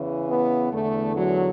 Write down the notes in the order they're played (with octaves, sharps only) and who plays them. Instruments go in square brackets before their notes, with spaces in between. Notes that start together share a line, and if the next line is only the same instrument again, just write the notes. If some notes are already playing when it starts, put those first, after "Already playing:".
Already playing: [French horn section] E2 C#3 E3
B3
E2 D3 A3
F#3